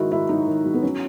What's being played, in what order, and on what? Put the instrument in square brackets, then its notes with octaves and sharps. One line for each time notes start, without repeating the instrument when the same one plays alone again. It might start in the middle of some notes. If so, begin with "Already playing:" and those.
Already playing: [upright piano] G#2 D#3 [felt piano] E4 F#4
[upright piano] G#2 [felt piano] E4
[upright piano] F#3 [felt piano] D#4
[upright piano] D#3
F#3
[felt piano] B3
[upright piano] F#3 [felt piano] C#4